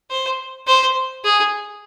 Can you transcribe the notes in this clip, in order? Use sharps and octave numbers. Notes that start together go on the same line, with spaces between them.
C5
C5
G#4